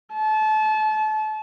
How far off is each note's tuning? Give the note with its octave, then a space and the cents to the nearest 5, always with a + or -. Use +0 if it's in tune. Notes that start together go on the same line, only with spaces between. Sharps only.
A5 -30